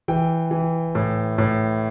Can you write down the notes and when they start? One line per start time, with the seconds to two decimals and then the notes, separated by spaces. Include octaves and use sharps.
0.08 E3 G5
0.51 E3
0.95 A2
1.38 A2